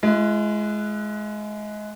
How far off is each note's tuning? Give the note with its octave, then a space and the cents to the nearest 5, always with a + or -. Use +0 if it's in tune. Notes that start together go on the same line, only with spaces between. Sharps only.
G#3 +25 F4 -45